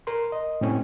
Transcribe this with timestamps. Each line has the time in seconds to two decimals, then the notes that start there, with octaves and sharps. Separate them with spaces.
0.07 A#4 C6
0.32 D#5
0.61 A2 C4 C#4